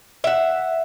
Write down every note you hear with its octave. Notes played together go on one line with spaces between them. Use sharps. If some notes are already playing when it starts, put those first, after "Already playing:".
E5 F#5